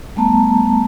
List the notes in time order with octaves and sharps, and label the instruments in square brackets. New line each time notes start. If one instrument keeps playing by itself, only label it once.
[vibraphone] G3 A3 B3 A5 A#5